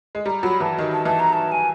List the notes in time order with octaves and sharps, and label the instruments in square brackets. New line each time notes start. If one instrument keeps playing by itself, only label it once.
[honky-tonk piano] G#3
[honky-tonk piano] G3 [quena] A#5
[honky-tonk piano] F#3 [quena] B5
[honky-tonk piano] E3 [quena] A5
[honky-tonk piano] D#3
[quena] A5
[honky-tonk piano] E3 [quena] A5
[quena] A#5
A5
G#5